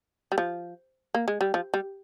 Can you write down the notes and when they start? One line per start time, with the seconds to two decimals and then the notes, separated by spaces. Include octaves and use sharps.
0.32 G3
0.38 F3
1.14 A#3
1.28 G#3
1.41 G3
1.54 F3
1.74 G3